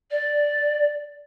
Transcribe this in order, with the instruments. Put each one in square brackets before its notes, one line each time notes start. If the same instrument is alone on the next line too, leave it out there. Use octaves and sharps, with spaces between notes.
[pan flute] D5